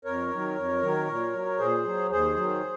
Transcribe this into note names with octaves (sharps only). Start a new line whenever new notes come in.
F2 A#4 C#5
D#3 F#3
F2
D#3 F#3
A#2
F#3
A#2 G#4 C5
F#3
D#2 G#4 C5
D#3 F#3